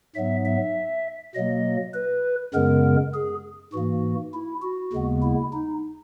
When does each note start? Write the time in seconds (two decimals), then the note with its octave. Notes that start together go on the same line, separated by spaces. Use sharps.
0.15 G#2 F#3 B3 E5
0.45 E5
1.35 B2 F#3 A#3 D#5
1.94 B4
2.54 F#2 C#3 G#3 B3 A#4
3.14 G#4
3.73 G#2 E3 A#3 F#4
4.34 E4
4.62 F#4
4.93 D#2 C#3 G#3 B3
5.22 E4
5.53 D#4